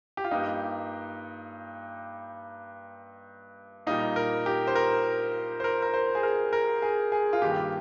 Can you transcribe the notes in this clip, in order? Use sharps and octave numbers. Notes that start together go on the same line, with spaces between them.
G4
F4
G2 G3 A#3 D#4
A#2 G3 A#3 D#4
A#4
G4
C5
A#4
C5
A#4
A#4
C5
G#4
A#4
A#4
G#4
G#4
F4
G2 D#3 A#3 G4